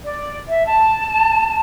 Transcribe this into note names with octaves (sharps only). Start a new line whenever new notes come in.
D5
E5
A5